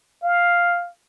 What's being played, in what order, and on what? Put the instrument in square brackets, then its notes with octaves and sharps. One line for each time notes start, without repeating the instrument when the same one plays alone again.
[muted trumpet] F5